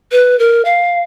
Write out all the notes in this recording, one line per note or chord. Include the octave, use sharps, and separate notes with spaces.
B4
A#4
F5